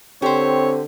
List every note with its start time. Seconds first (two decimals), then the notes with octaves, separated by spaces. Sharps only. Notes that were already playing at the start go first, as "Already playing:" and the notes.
0.22 D3 C4 G4 C5 C#5